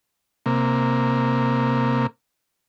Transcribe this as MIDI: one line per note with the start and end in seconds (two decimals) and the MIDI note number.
0.46 2.07 48
0.46 2.07 58